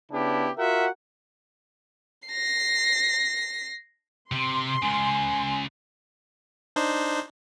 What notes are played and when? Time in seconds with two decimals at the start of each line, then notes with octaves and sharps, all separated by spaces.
0.12 C#3 B3 D4 E4 G4
0.58 F4 F#4 A#4 E5 F#5
2.28 A#6 C7
4.31 C3 C6
4.82 C#2 C#3 G#5
6.76 D4 D#4 C5